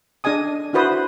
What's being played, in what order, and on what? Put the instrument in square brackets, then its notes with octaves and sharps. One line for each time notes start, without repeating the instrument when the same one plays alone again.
[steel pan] D4 G#4 D#5 G#5 D#6
D4 E4 F#4 B4 C5 D#6